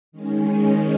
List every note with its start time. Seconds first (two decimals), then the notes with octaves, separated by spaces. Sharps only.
0.12 D#3 G#3 C#4